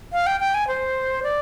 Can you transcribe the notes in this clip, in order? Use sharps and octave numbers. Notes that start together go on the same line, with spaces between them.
F5
G5
G5
G#5
C5
D5